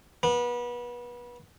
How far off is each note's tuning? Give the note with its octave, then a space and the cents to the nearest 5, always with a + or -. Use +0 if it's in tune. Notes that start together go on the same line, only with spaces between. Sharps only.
B3 -30